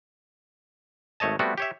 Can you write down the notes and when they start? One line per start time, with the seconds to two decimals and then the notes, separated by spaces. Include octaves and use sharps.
1.20 G#1 A3 C#5 D#5 A5
1.39 G3 A3 B3 C4 F#4
1.58 G4 C#5 E5